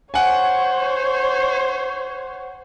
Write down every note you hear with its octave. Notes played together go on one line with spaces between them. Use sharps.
C5 C#5 F#5 G#5